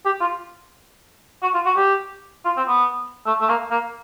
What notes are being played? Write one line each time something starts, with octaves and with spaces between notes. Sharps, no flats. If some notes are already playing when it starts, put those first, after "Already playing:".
G4
F4
F#4
F4
F#4
G4
F4
C4
B3
A3
A3
A#3
A#3